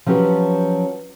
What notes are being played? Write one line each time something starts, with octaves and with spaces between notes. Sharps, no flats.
F3 F#3 C#4 G4 B4